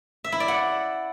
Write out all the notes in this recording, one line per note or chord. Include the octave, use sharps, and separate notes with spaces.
E5
E4
D5
F#5